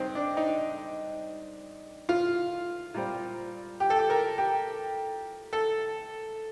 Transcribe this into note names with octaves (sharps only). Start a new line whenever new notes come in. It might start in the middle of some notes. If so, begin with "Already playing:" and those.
Already playing: G2 D#3 C4 D#4 G4
D4
D#4
F4
A#2 G3 C4
G4
A4
G4
A#4
G4
A4